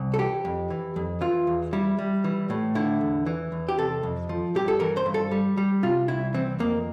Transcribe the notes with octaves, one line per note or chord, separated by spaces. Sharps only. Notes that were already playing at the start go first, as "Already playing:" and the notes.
Already playing: C2
A4
E3 G4
F2
E3
F2
E3 F4
E2
G3 E4
G3
E3
A2
D3 E4
E2
E3
E2
G4
C3 A4
F2
F3
G2 G4
A4
E3 A#4
C5
G2
A4
G3
G3
C3 F4
C2 E4
E3 C4
F2 A#3